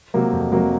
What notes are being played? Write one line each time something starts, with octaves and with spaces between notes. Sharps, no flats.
C3 F#3 A#3
F2
C3 F#3 A#3